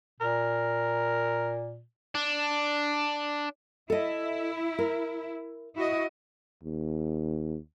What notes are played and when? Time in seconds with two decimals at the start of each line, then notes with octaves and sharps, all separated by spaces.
0.21 A#2 A#4
2.15 D4
3.90 E4 A4 D#5
4.79 A#4
5.75 E4 F#4 D#5
6.63 D#2